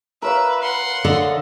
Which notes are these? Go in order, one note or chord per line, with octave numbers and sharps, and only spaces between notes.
A#4 B4 C#5 E5 F5
F#5 C6
D3 D#5